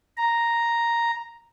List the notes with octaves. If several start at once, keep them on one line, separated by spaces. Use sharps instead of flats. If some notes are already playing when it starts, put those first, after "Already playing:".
A#5